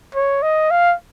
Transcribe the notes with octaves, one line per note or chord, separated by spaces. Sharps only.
C#5
D#5
F5